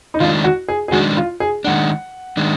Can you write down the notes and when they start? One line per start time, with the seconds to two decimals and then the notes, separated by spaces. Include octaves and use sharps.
0.14 D#4
0.20 D#3 G#3 D4 F4
0.44 F#4
0.68 G#4
0.88 G#4
0.92 D#3 G#3 D4 F#4
1.17 F4
1.40 G#4
1.64 D#3 G#3 D4 F#5
2.37 D#3 G#3 D4